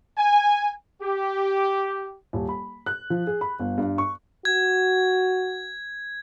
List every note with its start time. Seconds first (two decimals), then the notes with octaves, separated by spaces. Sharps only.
0.18 G#5
1.02 G4
2.33 D#1
2.49 B5
2.86 F#6
3.10 F3
3.27 G#4
3.41 B5
3.59 G1
3.78 G2
3.98 C#6
4.45 F#4 G#6